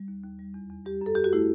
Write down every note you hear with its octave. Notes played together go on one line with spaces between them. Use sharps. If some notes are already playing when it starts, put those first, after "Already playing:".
Already playing: G3
D#2
D#2
G3
E2
E2
G3 G4
F#2 A4
F#2 G4
F#4
A3 E4